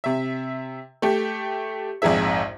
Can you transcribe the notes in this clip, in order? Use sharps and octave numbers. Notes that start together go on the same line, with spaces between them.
C3 E5
A3 G4
A#1 F2 G#2 G#4 E5